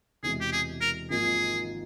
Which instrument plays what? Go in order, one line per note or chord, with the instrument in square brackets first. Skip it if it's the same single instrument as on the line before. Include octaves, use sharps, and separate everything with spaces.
[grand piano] E1 E2 C3 E3 G#3 [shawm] G#4
[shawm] G4
G#4
A#4
[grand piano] G#1 G#2 F3 A#3 F4 [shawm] G#4